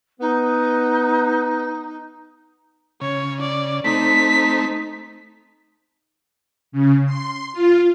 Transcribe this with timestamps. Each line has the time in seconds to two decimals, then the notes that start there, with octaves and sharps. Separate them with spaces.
0.20 B3 D#4
3.01 C#3 C#5
3.40 D5
3.84 A3 C4 D#4 B6
6.72 C#3
7.05 C6
7.53 F4